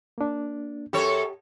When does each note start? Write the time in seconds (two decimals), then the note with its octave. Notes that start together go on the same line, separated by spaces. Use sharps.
0.18 A#3 D4
0.93 F#2 G4 A4 C#5